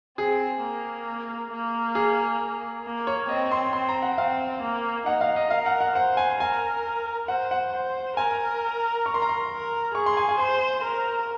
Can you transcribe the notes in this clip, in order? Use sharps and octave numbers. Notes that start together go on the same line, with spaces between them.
C4 G#4
A#3
A#3
G#4
A#3
C#5
C4 D#5
C6
C4 C6
A#5
F#5
C4 F5
A#3
D#4 F#5
F5
D#5
A#4 F5
F#5
F#5
C5 F#5
G#5
A#4 G#5
C5 F#5
F#5
C5
A#4 G#5
C#6
C6
A#5
C6
A#4
G#4 C#6
C6
G#5
G#5
C5 C6
A#4